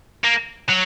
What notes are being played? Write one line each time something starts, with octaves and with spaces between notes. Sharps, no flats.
A#3
F#3